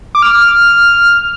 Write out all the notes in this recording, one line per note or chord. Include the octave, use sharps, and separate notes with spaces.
D6
F6